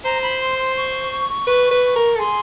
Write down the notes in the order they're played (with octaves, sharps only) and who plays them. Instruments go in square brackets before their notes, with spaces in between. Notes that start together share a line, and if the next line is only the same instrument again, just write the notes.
[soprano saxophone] C5 [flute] A#5
[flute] B5
C6
C6
C#6
[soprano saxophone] B4
B4
A#4
A4
[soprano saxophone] G#4 [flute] C6